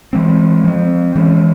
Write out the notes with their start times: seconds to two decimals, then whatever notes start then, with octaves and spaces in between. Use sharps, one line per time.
0.13 E3 G#3 C4
0.64 F3 C4
1.16 E3 G#3 C#4